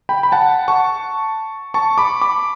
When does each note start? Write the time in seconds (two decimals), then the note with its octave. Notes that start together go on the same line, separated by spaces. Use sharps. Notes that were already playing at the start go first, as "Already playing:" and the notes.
0.09 G5 B5
0.23 B5
0.32 F#5 A5
0.68 A5 C#6
1.74 A5 C#6
1.98 B5 D6
2.22 B5 D6